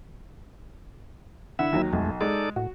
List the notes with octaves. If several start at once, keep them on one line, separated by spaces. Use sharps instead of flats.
D3 E4 E5 F#5
D#2 D#3 F#3
B1 F2 G#3 A3
G#3 D#4 A4 D5
A2 F#4